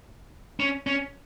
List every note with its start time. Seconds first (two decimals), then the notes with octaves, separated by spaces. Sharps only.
0.60 C#4
0.87 C#4